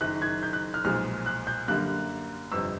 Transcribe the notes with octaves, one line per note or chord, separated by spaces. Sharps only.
F#1 F#2 D#3 F#6
G#6
G6
F#6
F6
B1 A#2 F3 G#3 F6
F#6
G6
F#2 D3 G3 A#3 F#6
G1 F2 C3 E6